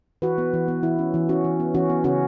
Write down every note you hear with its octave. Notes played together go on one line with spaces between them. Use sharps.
E3 F#4 B4
B3
E3
B3
E3 E4
C#4
E3
C#4 F#4
E3
B3
E3 C#4 F#4
B3
C#3 C#4 F#4